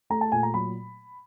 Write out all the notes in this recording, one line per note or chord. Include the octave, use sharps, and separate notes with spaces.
A3 A#5
A5
A#2 G#5
A#5
F#3 B5